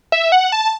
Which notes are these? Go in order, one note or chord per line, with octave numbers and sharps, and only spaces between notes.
E5
F#5
A5